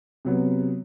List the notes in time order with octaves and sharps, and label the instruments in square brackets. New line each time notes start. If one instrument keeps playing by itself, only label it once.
[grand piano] C3 F#3 B3